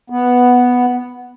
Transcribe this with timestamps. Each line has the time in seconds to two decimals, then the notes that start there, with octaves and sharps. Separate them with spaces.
0.10 B3